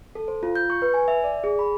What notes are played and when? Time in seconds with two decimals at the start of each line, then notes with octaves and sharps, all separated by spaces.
0.15 A4
0.28 C5
0.43 F4
0.56 G6
0.70 C#6
0.82 B4
0.94 G#5
1.08 E5
1.24 D5
1.44 G#4
1.59 B5